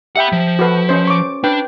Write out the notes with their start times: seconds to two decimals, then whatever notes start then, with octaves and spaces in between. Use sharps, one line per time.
0.16 G4 E5 F#5 G5 B5
0.32 F3
0.59 F#4 A4 B4
0.89 C#4 C5
1.07 C#6 D6
1.44 D4 B4 G5